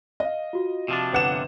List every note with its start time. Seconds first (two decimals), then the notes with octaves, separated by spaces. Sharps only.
0.20 D#5 F5
0.53 F4 F#4
0.88 C3 F3 D4
1.13 G1 F#5 E7